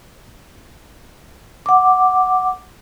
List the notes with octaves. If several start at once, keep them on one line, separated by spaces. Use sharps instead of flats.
F#5 D6